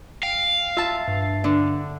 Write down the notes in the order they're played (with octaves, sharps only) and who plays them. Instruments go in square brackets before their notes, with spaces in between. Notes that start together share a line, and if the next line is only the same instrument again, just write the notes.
[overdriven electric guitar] F5 [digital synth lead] G5
[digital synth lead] F4 [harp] E5 A5
[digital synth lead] G2
[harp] D3 D4